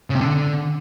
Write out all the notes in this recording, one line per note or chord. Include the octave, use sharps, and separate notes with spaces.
C#3
C3
D3